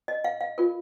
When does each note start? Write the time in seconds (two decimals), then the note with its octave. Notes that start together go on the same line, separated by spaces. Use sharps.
0.08 D#5
0.24 F5
0.41 F5
0.58 F4 A#4